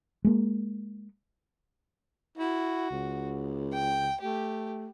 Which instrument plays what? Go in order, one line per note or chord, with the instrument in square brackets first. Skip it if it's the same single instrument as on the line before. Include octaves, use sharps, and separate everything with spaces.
[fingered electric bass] G#3 A#3
[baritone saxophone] E4 [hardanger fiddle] F#4
[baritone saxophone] C#2
[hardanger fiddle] G5
[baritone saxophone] A3 [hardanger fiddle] G4